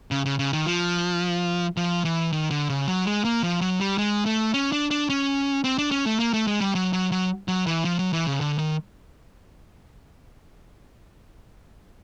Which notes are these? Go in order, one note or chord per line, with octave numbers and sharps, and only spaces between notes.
C#3
C#3
C#3
D#3
F3
F3
E3
D#3
D3
C#3
F#3
G#3
A#3
F3
F#3
G3
G#3
A3
C#4
D4
D4
C#4
C4
D4
C#4
A3
A#3
A3
G#3
G3
F#3
F#3
F#3
F#3
E3
F3
F#3
E3
C#3
D3
D#3